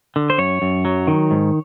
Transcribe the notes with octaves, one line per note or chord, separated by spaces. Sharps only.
D3
C5
F#2 C#5
F#2
F#3
D#3
G#2